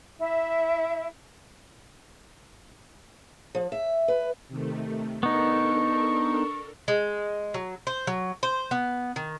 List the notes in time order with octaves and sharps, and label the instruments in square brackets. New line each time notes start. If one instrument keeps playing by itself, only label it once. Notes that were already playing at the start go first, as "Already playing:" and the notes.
[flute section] E4 E5
[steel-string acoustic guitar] F3
E5
B4
[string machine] C3 D#3 A3
[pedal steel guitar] B3 D#4 [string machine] D4 A4 A#4 [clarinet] C#6
[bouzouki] G#3
F#3
C5
F#3
C5
B3
D#3